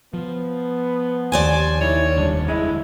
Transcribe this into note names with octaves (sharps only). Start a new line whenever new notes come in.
F3 B3
D#2 C5 D5 G#5
D#3 E4 C#5
F1 D3 G3 D4
G#3 E4